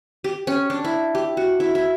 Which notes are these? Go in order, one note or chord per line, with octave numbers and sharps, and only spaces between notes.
G4
C#4
D4
E4
G4
F#4
E4
E4